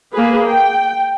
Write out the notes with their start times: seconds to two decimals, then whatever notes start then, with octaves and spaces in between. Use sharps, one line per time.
0.13 A#3 G#4 B4
0.46 G5